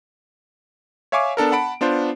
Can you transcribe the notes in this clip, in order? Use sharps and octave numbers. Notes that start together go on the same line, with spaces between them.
C#5 E5 F5 G#5 C#6 D6
B3 D4 A4 A#4
F#5 A5 B5 D7
B3 D4 F4 C5